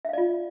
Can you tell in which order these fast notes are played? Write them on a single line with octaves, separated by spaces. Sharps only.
E5 F5 D5 F4